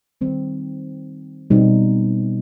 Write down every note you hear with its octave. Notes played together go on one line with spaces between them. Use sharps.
D#3 G3 C4
B2 G3 C4 D#4